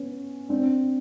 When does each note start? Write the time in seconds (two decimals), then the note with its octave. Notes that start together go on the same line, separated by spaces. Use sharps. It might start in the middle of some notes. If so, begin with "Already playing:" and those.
Already playing: B3 C#4
0.49 C4 D4